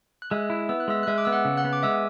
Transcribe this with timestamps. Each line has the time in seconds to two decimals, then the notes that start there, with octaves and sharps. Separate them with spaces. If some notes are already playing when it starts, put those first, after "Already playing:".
0.22 F#6
0.31 G#3 E5 E6
0.50 E4
0.69 B3 E6
0.80 F#6
0.88 G#3 E5 E6
1.03 F#6
1.07 G#3 E5 E6
1.18 D6
1.25 B3 E6
1.33 F#5 F#6
1.45 C#3
1.57 F#5 F#6
1.64 B3
1.73 D6
1.83 G#3 E5 E6